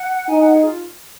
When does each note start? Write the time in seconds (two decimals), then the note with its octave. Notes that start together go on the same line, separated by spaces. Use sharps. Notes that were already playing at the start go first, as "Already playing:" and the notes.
Already playing: F#5
0.28 D#4 G#5
0.41 F#5
0.53 G#4
0.65 F4